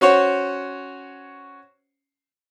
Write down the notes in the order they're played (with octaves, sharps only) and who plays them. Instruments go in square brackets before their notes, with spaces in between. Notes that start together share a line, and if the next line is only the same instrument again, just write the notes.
[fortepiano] C#4 F#4 C5 C#5